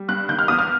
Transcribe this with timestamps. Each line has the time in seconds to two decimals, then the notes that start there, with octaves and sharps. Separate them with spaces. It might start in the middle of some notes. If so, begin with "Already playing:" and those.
Already playing: G3
0.08 G2 F#6
0.28 D#3 G6
0.39 F6
0.48 E2 D#6
0.59 F6